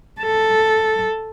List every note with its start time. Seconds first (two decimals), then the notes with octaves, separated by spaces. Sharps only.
0.21 A4